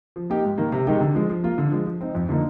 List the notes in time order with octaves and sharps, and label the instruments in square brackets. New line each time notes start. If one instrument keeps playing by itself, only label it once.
[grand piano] F3
A#3 D#4 G4
G#2
D#3 A#3
C3
D#3 G#3 D#4 G4
D3
F3 G#3
F3
A#3 F4
D3
F3 G#3
F3
C4 D#4
F2
D3 F3 A#3 D#4